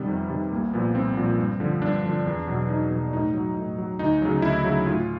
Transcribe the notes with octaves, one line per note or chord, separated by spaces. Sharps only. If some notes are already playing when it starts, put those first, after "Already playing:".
Already playing: C3 D#3 G3 B3
F2
C3 D#3 G3
C2 A#3
A#2 F3 B3
C2 C4
A#2 F3
G2
D3 F3
G2 D4
D3 F3
E2
B2 F#3
E2 D#4
B2 F#3
A2 D#4
F#3
A2
F#3
D2 D#4
C#3 F#3
D2 E4
C#3 F#3
A2 F4